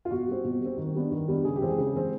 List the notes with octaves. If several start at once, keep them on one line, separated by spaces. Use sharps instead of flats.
F4
B2 F#4
G3 C4
B2
G3 C4
D#3
G3 B3 D4
D#3
G3 B3 D4
C#3 G#4
G4
E3 G#3 C4
G#4
C#3
E3 G#3 C4